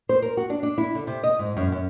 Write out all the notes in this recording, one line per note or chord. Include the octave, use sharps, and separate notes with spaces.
C5
A#4
F#4
D4
D4
E4
D3
C3
D#5
G#2
F#2
F#2